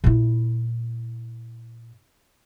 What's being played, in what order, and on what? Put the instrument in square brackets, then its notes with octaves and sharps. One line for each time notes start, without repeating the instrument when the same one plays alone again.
[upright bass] A#2 E4